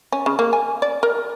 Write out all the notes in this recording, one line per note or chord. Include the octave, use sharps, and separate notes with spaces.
C#4
C#3
A#3
G#5
D5
A#4